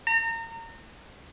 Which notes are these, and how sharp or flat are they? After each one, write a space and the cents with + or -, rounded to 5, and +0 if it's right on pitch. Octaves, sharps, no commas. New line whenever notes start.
A#5 -30